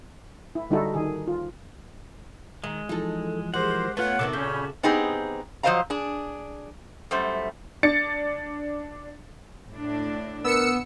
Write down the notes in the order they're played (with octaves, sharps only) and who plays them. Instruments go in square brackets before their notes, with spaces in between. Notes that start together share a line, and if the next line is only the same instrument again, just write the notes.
[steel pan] E4
D3 G3 D#4 E4 F#4 A4
D#3 G#4
F4
[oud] D#3 [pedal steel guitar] G#3
[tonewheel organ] E3 F3 [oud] D#4 A4
[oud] G#3 [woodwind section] G4 A#4 C5 [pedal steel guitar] F#5
[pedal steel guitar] A3 F4 [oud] B3 [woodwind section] C#5 F#5
[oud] C3 D#3 B3 [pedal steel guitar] F#4 A4 D6
[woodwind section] A#2 C#4 [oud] C#3 [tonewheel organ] B5 G6
[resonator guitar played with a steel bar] B3 C4 D#4 G4 G#4
F3 F#3 C5 D#5 F5 A#5
D4 G#4
F#2 G3 A3 C5
[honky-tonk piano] D4 A6 C#7
[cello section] A2 D4
[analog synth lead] B3 [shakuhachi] A#4 [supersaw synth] E6 C#7